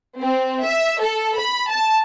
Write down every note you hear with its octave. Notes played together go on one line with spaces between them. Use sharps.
C4
E5
A4
B5
A5